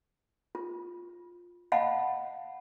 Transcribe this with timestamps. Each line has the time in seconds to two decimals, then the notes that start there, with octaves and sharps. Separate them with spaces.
0.55 F4
1.72 D#5 F5 F#5 A5 B5